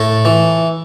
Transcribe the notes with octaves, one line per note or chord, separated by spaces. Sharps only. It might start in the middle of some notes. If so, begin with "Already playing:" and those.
Already playing: A2 A4
E3